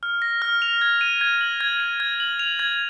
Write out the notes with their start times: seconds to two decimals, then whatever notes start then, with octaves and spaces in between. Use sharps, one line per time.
0.03 F6
0.22 A#6
0.42 F6
0.62 F7
0.81 G#6
1.01 D#7
1.21 G#6
1.41 F#7
1.61 G#6
1.80 D#7
2.00 G#6
2.20 F#7
2.39 F7
2.59 G#6